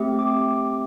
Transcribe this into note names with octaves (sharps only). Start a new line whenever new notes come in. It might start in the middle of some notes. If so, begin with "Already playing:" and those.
Already playing: A3 C4 G4
D6